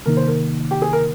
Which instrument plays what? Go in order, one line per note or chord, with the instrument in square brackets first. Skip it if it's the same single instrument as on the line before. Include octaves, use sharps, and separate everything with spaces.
[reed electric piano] C3 D#3 A#3 D#4 [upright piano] A#4
[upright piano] C5
A#4
G4
G#4
A#4